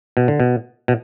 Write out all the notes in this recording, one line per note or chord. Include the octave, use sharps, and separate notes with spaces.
B2
D3
B2
B2